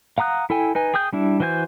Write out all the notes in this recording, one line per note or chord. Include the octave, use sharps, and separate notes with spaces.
F5 F#5 A#5 D#6 F#6
E4 A4 G5 G#5
D#4 B4 G#5
G#4 G5 D#6 G6
G3 D4 E4
E3 F#4 C5 G#5 G6